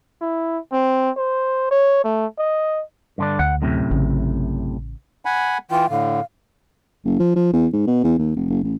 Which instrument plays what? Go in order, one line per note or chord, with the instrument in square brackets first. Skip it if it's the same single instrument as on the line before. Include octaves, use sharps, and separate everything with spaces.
[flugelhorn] E4
C4
C5
C#5
A3
D#5
[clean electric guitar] G2 D3 D4
[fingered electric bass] D2 [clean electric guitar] F#5
[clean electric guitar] F#2 A2 C3
[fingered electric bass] A1 C#3
[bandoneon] F#5 G#5 B5
[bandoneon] E3 F4 [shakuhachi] G5
[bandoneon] A2 D3 [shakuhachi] F5
[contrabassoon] F#1
F3
F3
E2
G#2
B2
E2
D#2
F1
F#1
A1